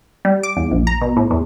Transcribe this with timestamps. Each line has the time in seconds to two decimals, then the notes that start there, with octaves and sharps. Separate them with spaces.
0.25 G3
0.43 D6
0.57 E2
0.71 A#1
0.87 A#5
1.01 B2
1.17 A2
1.31 E2